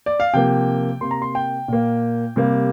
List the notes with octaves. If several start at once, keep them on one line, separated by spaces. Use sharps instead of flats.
D5
F5
C3 F3 A#3 G5
C3 A#3 C6
A#5
C6
G5
A#2 A#3
C3 G3 A#3